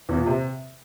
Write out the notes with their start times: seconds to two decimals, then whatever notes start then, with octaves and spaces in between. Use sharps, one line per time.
0.09 E2
0.18 A#2
0.26 C3